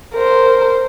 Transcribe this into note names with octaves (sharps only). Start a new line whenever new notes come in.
A#4 C5